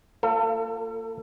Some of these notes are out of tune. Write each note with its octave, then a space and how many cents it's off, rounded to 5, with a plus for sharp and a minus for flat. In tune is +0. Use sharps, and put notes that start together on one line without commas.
A#3 -35 F4 -10 A4 +35